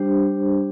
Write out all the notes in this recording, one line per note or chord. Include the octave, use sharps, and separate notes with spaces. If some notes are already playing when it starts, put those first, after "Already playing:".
Already playing: G3 D4 G4 C5